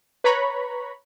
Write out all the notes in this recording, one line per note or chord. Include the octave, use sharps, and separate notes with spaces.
B4 C#5 A#5 B5 C#6